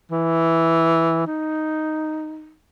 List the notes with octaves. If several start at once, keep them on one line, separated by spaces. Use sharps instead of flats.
E3
D#4